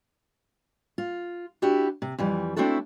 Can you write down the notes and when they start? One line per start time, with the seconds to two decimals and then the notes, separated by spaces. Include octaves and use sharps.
0.98 F4
1.62 D4 E4 F#4 G4
2.02 C3
2.18 F2 E3 G3
2.56 A3 C4 D4 E4 F#4 A4